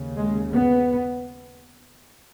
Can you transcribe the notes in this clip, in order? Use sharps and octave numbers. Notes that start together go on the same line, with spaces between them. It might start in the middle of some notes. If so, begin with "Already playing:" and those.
Already playing: D#2 C#3
G#3
B3